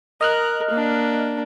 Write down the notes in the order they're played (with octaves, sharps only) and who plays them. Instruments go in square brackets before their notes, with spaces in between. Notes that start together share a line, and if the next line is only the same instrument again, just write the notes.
[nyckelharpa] A#4 [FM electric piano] D#5 F6 F#6
[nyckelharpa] A#3 D4